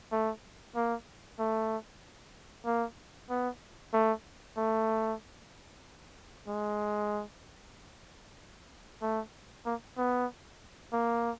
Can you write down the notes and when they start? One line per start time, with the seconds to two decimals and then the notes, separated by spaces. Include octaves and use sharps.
0.12 A3
0.75 A#3
1.39 A3
2.66 A#3
3.30 B3
3.94 A3
4.57 A3
6.47 G#3
9.02 A3
9.66 A#3
9.97 B3
10.93 A#3